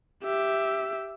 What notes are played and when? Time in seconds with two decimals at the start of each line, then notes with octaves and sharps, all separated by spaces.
0.24 G4 E5